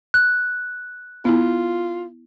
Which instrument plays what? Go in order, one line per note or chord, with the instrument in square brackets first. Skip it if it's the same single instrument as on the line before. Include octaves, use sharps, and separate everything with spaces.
[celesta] F#6
[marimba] B3 E4 [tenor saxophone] F4